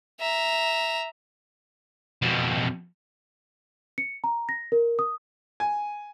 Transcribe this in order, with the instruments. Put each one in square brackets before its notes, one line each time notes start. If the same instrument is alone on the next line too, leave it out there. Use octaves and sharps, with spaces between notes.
[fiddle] E5 A#5
[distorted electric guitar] F2 B2
[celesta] C#7
A#5
A#6
A#4
D#6
[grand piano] G#5